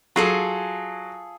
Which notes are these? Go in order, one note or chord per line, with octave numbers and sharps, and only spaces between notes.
F#3 F4 G#4 A4